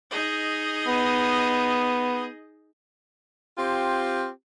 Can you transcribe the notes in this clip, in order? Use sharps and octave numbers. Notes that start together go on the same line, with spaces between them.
D#4 G#4 D#5
B3
C4 F4 G4